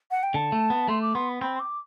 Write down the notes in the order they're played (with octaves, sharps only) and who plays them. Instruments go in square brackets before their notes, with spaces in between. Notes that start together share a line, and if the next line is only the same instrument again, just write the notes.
[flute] F#5
G5
[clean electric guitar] D3 [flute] A5
[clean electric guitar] A3
B3
[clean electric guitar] A3 [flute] C6
[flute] D6
[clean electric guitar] B3 [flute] C6
[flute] B5
[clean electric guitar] C4 [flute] B5
[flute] C6
D6